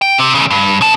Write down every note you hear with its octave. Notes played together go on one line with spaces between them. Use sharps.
G5
C3
E2 C#3
G2
C#3 A5